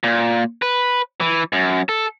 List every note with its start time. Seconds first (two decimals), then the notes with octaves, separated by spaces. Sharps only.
0.04 A#2
0.62 B4
1.21 E3
1.53 F#2
1.89 A4